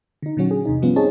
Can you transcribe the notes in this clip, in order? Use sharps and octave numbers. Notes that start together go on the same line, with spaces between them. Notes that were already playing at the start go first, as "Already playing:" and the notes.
D3 D#4
A#2 D3 F#3 C#4 F#4
G#4
E2 C3 D#4
G2 F3 G3 B3 C#4 F4
C4 D#4 G#4 C#5 A5